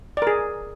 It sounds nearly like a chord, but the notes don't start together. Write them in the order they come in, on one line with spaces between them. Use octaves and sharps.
D5 A#4 G#4